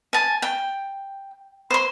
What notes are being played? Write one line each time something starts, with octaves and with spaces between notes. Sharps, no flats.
G#5 A5
G5
C5 C6